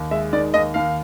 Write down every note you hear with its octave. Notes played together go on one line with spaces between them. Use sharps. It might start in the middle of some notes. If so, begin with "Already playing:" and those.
Already playing: D#2
G#3 E5
D#3 D5
D#2 D#5
D#2 F5